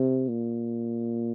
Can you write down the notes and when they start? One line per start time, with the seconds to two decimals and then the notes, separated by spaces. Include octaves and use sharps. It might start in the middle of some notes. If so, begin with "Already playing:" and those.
Already playing: C3
0.28 A#2